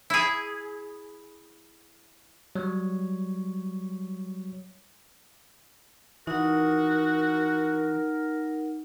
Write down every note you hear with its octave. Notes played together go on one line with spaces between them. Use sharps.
E4 G#4
F#3 G3 C#5
E3 D#4 F#4 A#4 F#5